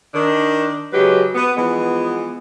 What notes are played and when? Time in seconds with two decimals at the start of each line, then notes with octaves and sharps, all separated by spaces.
0.14 D#3 D4
0.93 C#3 F#3 G#3 G4 B4
1.35 B3
1.57 E3 F3 G#3 B3